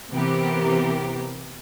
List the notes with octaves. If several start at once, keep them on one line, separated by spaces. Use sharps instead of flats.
C3 E3 B3 G4 A#4